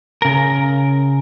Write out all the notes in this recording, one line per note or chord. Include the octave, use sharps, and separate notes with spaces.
C#3 A#4